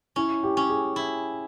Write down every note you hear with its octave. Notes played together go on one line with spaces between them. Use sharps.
C#4 E4
G4
C#4
G#4
E4